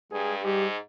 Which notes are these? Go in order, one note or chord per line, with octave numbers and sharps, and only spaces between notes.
G2 G#3 G#4
G#2 G3 G4